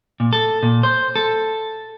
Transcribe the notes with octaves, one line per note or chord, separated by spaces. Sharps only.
A#2
A4
A#2
C5
A4